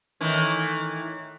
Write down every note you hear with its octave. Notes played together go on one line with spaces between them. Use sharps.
A2 D#3 E3